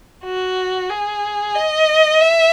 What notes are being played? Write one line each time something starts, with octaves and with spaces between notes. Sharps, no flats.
F#4
G#4
D#5
E5